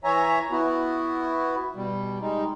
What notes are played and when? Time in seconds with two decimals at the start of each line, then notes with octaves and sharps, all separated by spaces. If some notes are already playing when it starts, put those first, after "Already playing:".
0.04 E3 C#5 E5 G#5 A#5
0.51 B3 E4 F#4
1.75 B2 G3
2.21 G3 G#3 D#4